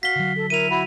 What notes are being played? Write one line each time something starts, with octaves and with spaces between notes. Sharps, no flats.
F#4 F5 B6 G7
D3 F#3
A4
E4 A#4 D#7 F7
E4 F#4 B5